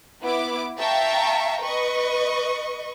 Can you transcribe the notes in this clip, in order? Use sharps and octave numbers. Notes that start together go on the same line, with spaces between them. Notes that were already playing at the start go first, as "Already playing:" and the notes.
B3 E4 D6
E5 F5 G5 A5 A#5 C#6
B4 D#5 C#6